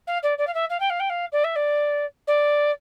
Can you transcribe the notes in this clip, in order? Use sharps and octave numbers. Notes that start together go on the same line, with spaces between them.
F5
D5
D5
F5
E5
F5
G5
F5
G5
F5
D5
E5
D5
D5